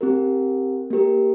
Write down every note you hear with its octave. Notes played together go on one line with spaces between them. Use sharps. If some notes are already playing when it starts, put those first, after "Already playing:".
C4 G4 A#4
A#3 G4 A#4